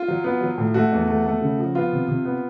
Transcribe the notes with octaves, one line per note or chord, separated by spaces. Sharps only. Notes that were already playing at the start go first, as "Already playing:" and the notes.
Already playing: F4
F#3
B3
F#3
A2
A3 F#4
E2
A3
A3
C#3
F3
B3 F4
C3
C3
B3